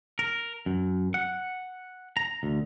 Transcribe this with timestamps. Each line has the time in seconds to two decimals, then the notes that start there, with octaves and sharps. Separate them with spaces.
0.19 A#4
0.66 F#2
1.14 F#5
2.17 A#5
2.43 D2